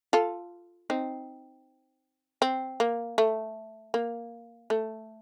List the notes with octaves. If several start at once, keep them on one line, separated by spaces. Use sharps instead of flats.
F4 A4
C4 D#4
C4
A#3
A3
A#3
A3